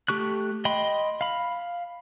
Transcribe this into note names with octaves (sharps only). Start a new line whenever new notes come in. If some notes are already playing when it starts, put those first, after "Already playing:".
A3 G4 C#6 F#6
D#5 G5 B5 C6
F5 B5